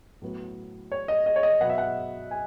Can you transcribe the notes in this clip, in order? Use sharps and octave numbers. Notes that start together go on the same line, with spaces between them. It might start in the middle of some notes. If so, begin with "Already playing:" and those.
A2 F#3 B3
C#5
D#5
D#5
C#5
D#5
B2 F#3 B3 F#5
E5
F#5
G#5